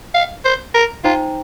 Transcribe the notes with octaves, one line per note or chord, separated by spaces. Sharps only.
F5
C5
A#4
D#4 F4 C5 G5 A#5